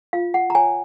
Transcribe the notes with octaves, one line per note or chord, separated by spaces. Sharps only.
F4 F5
F#5
A#5
C#5 G#5